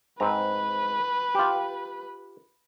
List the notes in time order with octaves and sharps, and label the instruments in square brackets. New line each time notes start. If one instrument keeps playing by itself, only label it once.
[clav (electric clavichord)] G#2 C4 A#5 [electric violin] B4
[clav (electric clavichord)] F4 G4